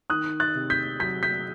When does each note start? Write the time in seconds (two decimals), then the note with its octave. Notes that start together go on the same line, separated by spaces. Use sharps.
0.10 D#3 D#6 F#6
0.40 F#6 A6
0.55 C3
0.70 G6 B6
1.00 F#3 G6 B6
1.23 G6 B6